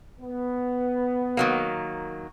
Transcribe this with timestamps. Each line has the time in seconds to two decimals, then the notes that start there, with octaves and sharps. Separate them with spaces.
0.20 B3
1.37 D#3 F#3 A#3